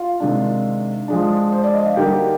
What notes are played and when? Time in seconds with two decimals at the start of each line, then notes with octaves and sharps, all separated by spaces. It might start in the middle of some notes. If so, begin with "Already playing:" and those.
Already playing: F4 F5
0.20 C3 D#3 G#3 D4
1.08 F3 G#3 D4
1.52 C5
1.63 D5
1.75 D#5
1.86 F5
1.96 D3 G3 A#3 D#4 G4 G5